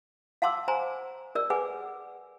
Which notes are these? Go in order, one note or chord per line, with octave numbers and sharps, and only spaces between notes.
F5 F#5 A5 C6 D6 E6
C5 G#5 A#5 C6
A#4 D5 E6
G#4 B4 F#5 G#5 D6